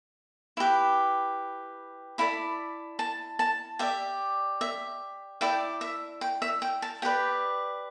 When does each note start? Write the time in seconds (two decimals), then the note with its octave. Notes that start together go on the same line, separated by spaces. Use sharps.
0.57 E4 G4 B4
2.18 E4 A4 D5 B5
2.99 A5
3.39 A5
3.79 G4 D5 E5
4.61 E5
5.41 E4 A4 D5 G5
5.81 E5
6.21 G5
6.42 E5
6.62 G5
6.82 A5
7.02 G4 B4 D5 G5